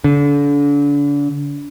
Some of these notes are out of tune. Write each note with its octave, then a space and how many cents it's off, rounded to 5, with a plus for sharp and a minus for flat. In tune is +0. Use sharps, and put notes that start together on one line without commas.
D3 -35